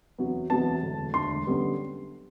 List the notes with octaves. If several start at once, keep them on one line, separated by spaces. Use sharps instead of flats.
E2 C3 F#3 B3
E2 C3 F#3 B3 A5
E1 D2 D3
E1 D2 D3 C6
F#2 D3 G3 B3